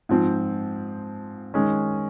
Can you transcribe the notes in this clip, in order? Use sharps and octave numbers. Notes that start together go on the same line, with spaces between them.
G#2 F3 C4
D#3 G#3 C#4